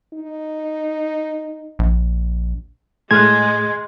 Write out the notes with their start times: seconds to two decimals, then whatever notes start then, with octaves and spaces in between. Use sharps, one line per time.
0.14 D#4
1.79 A#1
3.11 A2 G#3 A3 G#4 C6 F6 F#6 G#6